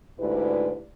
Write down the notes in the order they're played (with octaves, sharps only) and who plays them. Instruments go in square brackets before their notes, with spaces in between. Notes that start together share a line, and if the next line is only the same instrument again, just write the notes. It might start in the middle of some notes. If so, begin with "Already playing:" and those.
[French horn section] D2 G#2 E4 G4 B4 D5